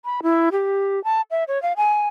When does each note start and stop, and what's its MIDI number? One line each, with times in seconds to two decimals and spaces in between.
0.05 0.20 83
0.23 0.49 64
0.52 1.02 67
1.04 1.21 81
1.31 1.44 76
1.48 1.61 73
1.62 1.73 77
1.77 2.08 80